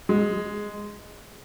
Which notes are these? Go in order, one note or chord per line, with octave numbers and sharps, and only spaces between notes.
G#3